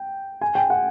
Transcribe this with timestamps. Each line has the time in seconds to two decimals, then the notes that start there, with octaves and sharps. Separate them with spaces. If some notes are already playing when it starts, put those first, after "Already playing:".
Already playing: G5
0.41 G#5
0.55 G5
0.70 F#5